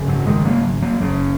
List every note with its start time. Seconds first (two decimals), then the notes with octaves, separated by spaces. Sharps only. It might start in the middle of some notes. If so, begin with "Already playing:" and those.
Already playing: G#1 F#2 C#3
0.08 F#3
0.26 D#3 G#3
0.45 F#3 A#3
0.82 F#3 A#3
1.01 F#1 F#2 C#3